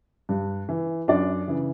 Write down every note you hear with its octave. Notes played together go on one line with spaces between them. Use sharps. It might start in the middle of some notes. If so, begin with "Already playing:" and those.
G2
E3
F#2 D4 D5
C#3 E3